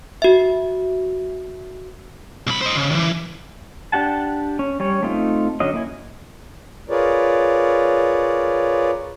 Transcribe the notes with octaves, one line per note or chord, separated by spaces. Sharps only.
F#4 E5
C2 B5
C5 D#5
C#3
D#3 E3
D4 G4 F#5 A5
C#4
G3 C#4 C#5
A3 C4 D#4 F4
D3 F#3 C#4 D#5
A#3 E4 G#5
F4 G#4 A#4 B4 C#5 D5